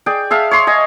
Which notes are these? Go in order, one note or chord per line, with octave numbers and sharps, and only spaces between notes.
G#4 D5 G5
G#4 E5 F5 A5
C#5 C6
D#5 G#5